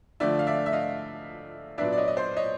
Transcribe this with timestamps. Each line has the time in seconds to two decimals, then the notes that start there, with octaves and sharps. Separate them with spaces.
0.20 D3 F3 A3 D5 E5
0.39 F5
0.47 D5 E5
0.66 E5
0.73 D#5 F5
1.78 A#2 F#3 B3 D4 D5 E5
1.93 D5
1.98 C#5 D#5
2.08 D#5
2.17 C5 D5
2.37 C#5 D#5